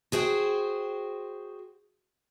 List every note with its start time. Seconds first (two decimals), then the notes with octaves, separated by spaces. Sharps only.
0.12 F#4 G#4 C5 G5